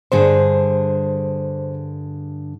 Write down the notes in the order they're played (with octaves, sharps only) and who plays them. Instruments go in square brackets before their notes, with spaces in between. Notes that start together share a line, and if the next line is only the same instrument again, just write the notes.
[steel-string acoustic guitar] G2 D3 G#4 [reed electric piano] C5